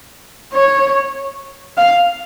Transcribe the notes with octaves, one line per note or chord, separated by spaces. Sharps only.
C#5
F5